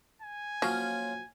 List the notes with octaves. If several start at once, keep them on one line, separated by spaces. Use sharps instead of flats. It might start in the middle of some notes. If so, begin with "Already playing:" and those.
G#5
F3 F#3 A#3 C#4 F4